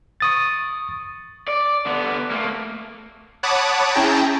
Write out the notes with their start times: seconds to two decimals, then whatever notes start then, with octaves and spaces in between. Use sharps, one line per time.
0.20 C#6 D#6 A6
1.48 D5
1.86 D3 B3
2.31 A3 A#3
3.43 C#5 F#5 A5 B5 D6 D#6
3.92 C#4 E4 G#4 G5 A5 A#5